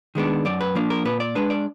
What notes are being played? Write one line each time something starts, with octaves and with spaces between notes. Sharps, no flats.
D#3 G#3 B3 D4
F#2 D5
B4
F3 A#3 D4
A#4
A#2 B4
D5
G#3 D4 B4
D5